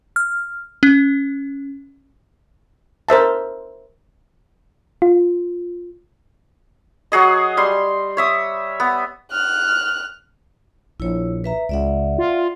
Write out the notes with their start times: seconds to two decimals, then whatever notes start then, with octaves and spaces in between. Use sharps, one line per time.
0.16 F6
0.83 C#4
3.09 A#4 C5 E5 A5
5.02 F4
7.12 F#3 F#4 G#4 D#5
7.57 G3 C6
8.17 C#5 E5 D#6
8.80 B3
9.32 F6 F#6
11.00 A#1 E4 C#5
11.44 B4 E5 A#5
11.69 C#2 D5 E5 F#5
12.18 F4